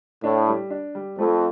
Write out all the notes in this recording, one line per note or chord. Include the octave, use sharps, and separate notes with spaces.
A2 D4
G3
D4
G3
F2 A3